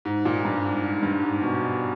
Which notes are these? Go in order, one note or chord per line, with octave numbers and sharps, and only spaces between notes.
G#2
A#2
G2
G#2
G#2
G2
G#2
B2